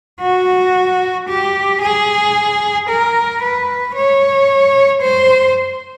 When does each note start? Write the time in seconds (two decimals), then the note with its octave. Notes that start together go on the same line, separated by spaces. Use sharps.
0.21 F#4
1.29 G4
1.81 G#4
2.89 A#4
3.42 B4
3.96 C#5
5.02 C5